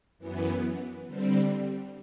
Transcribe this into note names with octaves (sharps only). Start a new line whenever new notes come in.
F#2 E3 B3
D3 G3 C4